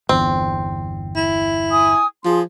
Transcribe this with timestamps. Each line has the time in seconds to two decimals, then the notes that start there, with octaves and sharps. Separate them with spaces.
0.09 G1 E2 C4
1.16 E4
1.70 G#5 D#6
2.25 F3 G#4 C6